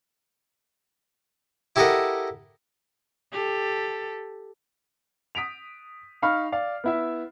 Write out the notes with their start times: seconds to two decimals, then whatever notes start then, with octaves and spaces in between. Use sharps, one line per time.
1.76 E4 G4 A4 A#4 D#5 F#5
3.33 G4 A4
5.35 D#6 B6 D7 F7
6.22 D#4 F5 B5 C#6 F6
6.52 D5 F5
6.84 B3 E4 E5